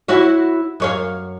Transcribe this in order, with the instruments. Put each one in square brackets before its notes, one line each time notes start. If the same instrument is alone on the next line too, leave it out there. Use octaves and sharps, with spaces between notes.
[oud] E4 F#4 C#5
F#2 C#5 F5